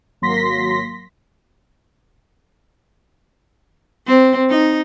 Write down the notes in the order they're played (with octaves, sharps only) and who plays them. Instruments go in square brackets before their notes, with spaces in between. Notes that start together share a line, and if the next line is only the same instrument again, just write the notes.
[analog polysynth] G#1 F#3 A#3 C6 A#6 B6
[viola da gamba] C4
D#4